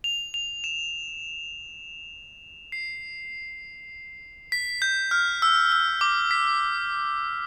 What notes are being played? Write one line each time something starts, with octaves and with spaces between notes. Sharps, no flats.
F7
F7
E7
C7
B6
G6
F6
E6
E6
D6
B6